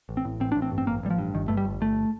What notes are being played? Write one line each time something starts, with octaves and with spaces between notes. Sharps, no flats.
A1
C4
A2
A1 C4
A1 D4
C4
G2
C4
A1 A#3
A1 G3
F3
G2
G1 D#3
G2 A3
G3
G1
G1 A3